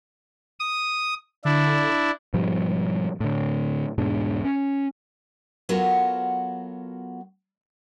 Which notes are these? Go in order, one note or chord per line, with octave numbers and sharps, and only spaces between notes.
D#6
D3 D4 E4
G#2 B2 F3 G3
A2 D3
E1 G#2 B2 D4
C#4
F#3 B3 F4 F#4 A4 A#4